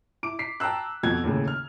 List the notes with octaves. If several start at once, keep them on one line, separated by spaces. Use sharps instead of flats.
E4 D6 D7
B6 C7
G5 A5 A#5 E6 F#6
F2 B2 G#6
D#2 A2 C#3
F6